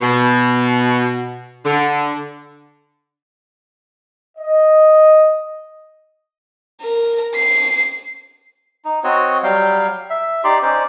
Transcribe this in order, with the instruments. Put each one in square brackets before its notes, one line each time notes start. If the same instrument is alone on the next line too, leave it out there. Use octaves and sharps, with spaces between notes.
[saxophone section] B2
D3
[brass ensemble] D#5
[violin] A#4
C7
[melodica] D#4
C4 F#4 C#5 D#5
F#3 G3 F5 G5
E5
D#4 G4 D5 C6
C#4 D#4 C5 D5